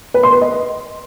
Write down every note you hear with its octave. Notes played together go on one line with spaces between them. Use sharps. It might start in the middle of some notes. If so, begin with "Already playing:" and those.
B4
C6
B4
D#5